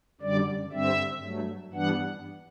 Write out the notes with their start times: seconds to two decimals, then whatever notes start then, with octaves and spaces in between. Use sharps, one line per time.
0.21 F#2 D3 G3 D5
0.72 G2 D3 G3 C4 E5
1.23 G2 F#3 A3
1.73 G2 E3 G3 B3 D4 F#5